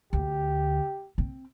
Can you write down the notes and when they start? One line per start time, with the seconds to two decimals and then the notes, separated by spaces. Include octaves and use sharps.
0.13 D2 G4
1.18 C4